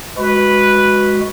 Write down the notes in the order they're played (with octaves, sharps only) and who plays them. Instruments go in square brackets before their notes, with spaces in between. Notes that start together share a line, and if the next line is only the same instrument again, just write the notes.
[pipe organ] G#3 F#4 [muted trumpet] B4